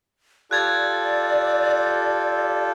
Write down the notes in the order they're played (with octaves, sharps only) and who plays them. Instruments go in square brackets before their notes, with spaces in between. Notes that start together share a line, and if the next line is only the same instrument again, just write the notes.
[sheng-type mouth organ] F4 G4 A4 [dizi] D5 [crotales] F#6 G#6 A6